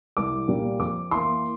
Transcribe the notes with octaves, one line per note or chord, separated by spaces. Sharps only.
C2 D6
A#2 G3 A#3
F2 D6
E3 A#3 C6